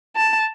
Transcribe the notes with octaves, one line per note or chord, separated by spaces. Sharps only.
A5